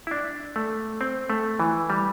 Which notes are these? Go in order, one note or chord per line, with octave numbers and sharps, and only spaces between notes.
E4
D4
A3
C4
A3
E3
G3